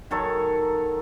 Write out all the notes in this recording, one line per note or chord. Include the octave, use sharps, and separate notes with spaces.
D#3 F#3 A4 C#5